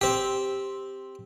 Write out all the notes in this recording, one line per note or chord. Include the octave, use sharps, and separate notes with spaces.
C4 G4